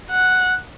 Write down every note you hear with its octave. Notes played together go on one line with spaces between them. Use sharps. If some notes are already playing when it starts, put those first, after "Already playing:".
F#5